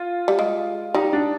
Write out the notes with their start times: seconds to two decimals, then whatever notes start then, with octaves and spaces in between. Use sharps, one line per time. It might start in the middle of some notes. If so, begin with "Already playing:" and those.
Already playing: F4
0.28 G3
0.39 G#3
0.94 G3 D#4
1.13 D4